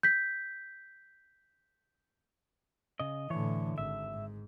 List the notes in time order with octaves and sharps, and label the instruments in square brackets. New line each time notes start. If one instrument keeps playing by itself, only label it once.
[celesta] G6 B6
[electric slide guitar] C#3 D#5
[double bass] A2 D3 [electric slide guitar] E3 C#5
[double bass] G#1 [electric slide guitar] E5
[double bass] G#2